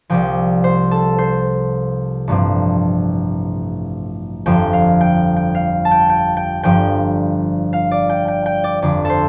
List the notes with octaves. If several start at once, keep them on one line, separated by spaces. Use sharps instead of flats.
C2 C3 F3 G5
C5
A4
C5
A1 G2 F3 C4
G1 F2 F3 A3 G5
F5
G5
G5
F5
A5
G5
G5
G5
G1 G2 F3 G5
F5
D5
G5
G5
G5
D5
G1 F2 D3 D5
A4 C5